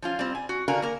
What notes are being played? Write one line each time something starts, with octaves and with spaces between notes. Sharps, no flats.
F3 C#4 F4
G3 C4
G#5
F#4
D3 F#4 A#4 F5 G#5
A#3 A#4